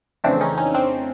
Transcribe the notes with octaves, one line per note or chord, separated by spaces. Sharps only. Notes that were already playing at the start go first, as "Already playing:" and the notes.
F2 C#3 E3 A3 C4 D4
C#4 D#4
C#4 D#4
C4 D4